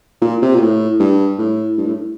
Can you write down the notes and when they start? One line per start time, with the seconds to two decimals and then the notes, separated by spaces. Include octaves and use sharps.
0.21 A#2
0.42 C3
0.55 A#2
0.60 A2
0.99 G2
1.38 A2
1.78 G2
1.86 A2